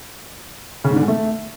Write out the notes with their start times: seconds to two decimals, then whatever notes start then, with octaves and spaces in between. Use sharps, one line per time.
0.84 C#3
0.90 G#2
0.96 D3
1.02 G#3
1.08 A3